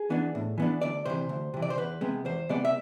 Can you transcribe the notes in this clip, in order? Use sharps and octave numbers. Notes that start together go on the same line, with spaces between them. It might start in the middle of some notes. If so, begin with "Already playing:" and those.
Already playing: G#4
E3 B3 D4
A2
E3 B3 D4
D2 D5
C3 E3 C5
D2
C3 E3
D5
C5
E2 B4
C3 G#3 B3
E2 C5
C3 G#3 B3 D5
E5